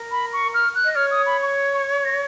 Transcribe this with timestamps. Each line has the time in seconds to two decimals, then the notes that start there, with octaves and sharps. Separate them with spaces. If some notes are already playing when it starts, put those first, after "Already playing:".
Already playing: A#4
0.11 B5
0.33 C#6
0.54 F6
0.75 F#6
0.85 D#5
0.95 C#5 F6
1.11 D#6
1.26 B5
1.42 C#6
1.74 C#6
2.05 A#6